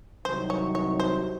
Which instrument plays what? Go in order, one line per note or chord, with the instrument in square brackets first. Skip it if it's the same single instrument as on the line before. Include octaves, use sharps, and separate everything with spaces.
[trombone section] C2 C3 D#3 F#3 [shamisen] C5
[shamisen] C#5
C#5
C5